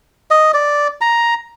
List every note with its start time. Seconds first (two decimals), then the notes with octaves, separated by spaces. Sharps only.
0.31 D#5
0.54 D5
1.01 A#5